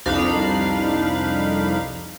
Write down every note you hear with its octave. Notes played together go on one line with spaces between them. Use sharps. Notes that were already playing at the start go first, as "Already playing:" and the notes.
C2 F2 D4 D#4 F5 B5